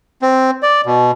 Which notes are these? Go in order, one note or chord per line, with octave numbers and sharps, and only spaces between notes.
C4
D5
B2